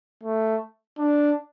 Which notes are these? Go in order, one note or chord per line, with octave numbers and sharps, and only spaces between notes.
A3
D4